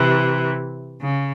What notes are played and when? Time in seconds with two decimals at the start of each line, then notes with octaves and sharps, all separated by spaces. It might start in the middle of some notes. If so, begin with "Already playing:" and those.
Already playing: C3 E3
1.01 C#3